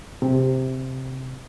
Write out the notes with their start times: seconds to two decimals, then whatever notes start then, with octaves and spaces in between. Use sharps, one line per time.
0.22 C3